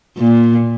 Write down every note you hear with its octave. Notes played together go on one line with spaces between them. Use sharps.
A#2